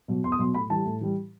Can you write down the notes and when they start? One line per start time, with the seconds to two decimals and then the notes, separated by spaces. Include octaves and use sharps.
0.08 B2 F#3
0.24 E2 C6
0.32 D#6
0.39 B2 F#3 C6
0.54 A2 B5
0.70 E3 G3 A5
0.86 A2
1.01 E3 G3